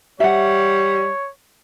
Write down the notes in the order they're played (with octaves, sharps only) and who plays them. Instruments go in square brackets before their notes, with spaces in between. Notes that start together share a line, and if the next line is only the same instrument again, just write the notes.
[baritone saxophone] G3 [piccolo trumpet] C#5 [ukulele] E5 F#5